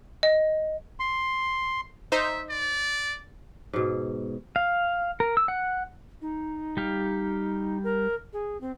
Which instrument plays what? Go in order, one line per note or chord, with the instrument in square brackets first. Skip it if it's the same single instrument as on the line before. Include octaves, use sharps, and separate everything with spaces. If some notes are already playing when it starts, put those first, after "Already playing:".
[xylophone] D#5
[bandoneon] C6
[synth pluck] D#4 C5 [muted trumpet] E5
[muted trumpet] D5
[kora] G#2 B2
[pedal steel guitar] F5
A#4
E6
F#5
[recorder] D#4
[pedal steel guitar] G3 G4 F5
[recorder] A#4
G#4
C4